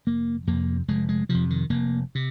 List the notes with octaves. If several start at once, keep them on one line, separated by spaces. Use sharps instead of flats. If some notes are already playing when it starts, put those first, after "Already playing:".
F1 A#3
F2 A#3
C3
F1 G#3
G#3
F2 C3 F3
D#3
F1 A#3
C3